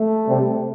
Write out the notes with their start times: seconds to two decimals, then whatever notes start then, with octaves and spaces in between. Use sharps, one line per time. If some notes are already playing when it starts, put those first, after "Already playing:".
Already playing: A3
0.26 C3 G3